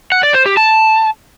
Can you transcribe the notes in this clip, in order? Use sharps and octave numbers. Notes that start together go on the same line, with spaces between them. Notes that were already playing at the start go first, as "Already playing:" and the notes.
F#5
D5
C5
G4
A5